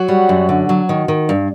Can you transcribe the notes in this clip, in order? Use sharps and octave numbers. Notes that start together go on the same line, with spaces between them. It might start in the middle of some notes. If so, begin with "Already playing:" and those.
Already playing: F#3 F#4
G3
F#2
D3
F#3
D#3
D#3
G2